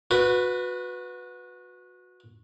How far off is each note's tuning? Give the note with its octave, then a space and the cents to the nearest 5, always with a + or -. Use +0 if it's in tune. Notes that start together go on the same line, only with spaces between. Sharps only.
F#4 -25 B4 +0